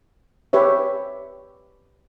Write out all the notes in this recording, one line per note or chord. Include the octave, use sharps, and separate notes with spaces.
G4 B4 C#5 E5